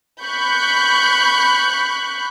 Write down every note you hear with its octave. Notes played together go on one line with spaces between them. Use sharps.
B5 C#6 F#6 G6